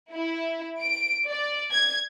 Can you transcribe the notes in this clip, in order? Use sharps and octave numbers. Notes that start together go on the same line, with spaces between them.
E4
D7
D5
G#6